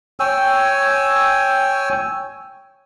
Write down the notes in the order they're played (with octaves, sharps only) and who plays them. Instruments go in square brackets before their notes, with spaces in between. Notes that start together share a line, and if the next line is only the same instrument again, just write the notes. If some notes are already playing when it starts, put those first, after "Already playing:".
[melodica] C#5 G5 G#5 E6